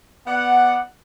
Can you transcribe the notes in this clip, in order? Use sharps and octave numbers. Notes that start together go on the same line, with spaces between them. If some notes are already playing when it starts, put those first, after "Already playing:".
B3 D5 F#5